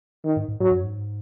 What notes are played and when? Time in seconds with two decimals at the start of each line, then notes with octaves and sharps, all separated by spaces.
0.25 D#3
0.36 G#2
0.48 G#2
0.60 G#2 F#3
0.71 F#2
0.84 G#2